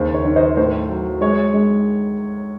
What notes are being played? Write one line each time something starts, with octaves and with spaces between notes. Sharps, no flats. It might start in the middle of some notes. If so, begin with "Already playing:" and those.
Already playing: D#2 C#3 C5
C#5
D#3
C5 D#5
A2 C5
F#3
G#3 C#5
G#3